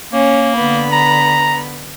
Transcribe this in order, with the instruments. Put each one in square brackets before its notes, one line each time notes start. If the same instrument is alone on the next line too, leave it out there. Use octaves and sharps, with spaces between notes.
[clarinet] A#3 [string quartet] C#4
[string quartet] D3 B3 B5
[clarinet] A#5